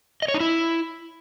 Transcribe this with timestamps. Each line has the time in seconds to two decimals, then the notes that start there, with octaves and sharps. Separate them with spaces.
0.22 D#5
0.28 C#5
0.34 D#4
0.40 E4